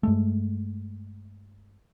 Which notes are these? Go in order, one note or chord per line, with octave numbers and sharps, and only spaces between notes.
G2 G#3 A3